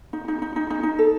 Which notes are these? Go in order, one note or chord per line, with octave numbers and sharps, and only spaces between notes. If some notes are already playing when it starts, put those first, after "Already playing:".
D#4
D#4
D#4
D#4
D#4
D#4
A4